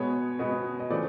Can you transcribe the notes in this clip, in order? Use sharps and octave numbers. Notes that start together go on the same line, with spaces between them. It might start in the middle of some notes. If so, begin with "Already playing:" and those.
Already playing: B2 G#3 B3 C#5
B2 G#3 B3 D#5
D#5
C#3 E3 A3 C4 D5